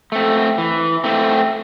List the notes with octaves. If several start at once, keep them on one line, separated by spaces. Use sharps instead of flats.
A3 C4
E3
A3 C4